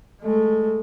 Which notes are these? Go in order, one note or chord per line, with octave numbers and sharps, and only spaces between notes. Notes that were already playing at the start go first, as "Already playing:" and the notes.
G#3 A3